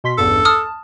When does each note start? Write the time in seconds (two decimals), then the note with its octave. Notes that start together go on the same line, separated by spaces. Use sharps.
0.04 B2 C6 B6
0.18 A1 E2 G2 A4
0.45 A5 D#6 F6